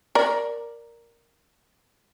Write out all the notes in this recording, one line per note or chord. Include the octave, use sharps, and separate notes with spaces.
A#4 D5